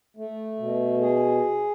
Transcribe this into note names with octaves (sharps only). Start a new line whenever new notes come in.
A3
B2
G#4